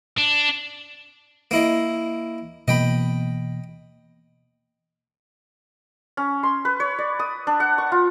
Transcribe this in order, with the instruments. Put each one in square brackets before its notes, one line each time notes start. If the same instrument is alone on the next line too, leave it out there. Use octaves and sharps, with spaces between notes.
[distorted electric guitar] D4
[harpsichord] A#3 E4 D#5
[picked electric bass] B2 E3 A#3 [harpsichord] D#5 G5 B5
[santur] C#4
C6
B4
C#5
D5
D#6
D4
F#5
C#6
F4